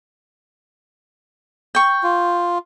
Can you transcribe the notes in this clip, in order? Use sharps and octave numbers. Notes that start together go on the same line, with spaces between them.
G5 C#6
F4